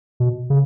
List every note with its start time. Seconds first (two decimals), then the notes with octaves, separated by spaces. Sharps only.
0.20 B2
0.50 C#3